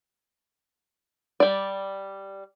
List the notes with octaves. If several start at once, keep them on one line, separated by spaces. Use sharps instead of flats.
G3 D5